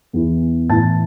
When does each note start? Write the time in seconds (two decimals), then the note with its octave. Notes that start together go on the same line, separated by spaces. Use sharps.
0.13 E2 E3
0.69 A2 E3 A5 A6